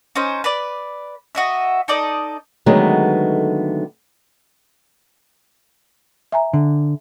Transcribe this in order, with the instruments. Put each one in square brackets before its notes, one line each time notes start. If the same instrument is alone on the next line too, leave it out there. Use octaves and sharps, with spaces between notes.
[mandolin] C#4 D#4 C5
B4 D5
F#4 D#5 E5
D#4 A4 D5 D#5
[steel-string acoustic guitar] D3 D#3 F#3 G#3 A3 B3
[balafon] E5 G#5 A#5
[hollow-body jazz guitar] D3